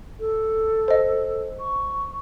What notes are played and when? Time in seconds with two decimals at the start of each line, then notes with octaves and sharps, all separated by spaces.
0.20 A4
0.88 C5 D#5
1.60 C#6